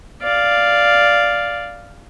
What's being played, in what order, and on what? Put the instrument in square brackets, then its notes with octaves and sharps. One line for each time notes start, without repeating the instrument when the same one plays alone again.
[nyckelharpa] D5 F5